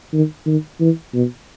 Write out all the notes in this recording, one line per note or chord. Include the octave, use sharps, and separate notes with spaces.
D#3
D#3
E3
B2